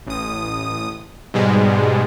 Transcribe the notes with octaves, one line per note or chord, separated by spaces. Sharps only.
A1 D#6
G#2 B2 G3 G#3